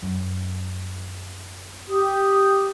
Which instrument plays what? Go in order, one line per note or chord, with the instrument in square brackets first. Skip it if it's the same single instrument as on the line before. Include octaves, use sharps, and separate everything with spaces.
[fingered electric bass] F#2
[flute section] G4 D#6